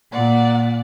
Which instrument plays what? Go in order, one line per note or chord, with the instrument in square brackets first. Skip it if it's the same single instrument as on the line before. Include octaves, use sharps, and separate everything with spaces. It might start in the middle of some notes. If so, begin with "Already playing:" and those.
[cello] A#2 [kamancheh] D5 F#5